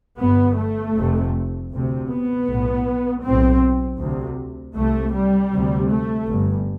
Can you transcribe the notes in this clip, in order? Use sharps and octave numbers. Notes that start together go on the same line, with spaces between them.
G1 G2 B3
A3
F1 F2 C3
D2 C3
B3
B1 A2
B1 A2 C4
D2 C3
C2 C3 A3
G3
D2 C3
A3
G1 G2